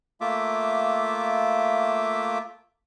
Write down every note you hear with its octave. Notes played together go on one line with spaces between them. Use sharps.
A3 A#3 F4 E5 D6